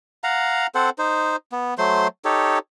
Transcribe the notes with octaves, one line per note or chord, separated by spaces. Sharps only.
F5 F#5 A#5
C4 A4 C5 F#5
D#4 C5
B3
F#3 A3 C5 C6
D#4 G4 A4 C#5